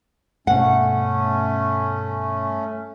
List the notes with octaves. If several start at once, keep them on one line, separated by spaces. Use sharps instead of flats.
G2 B2 A3 C#4 F#5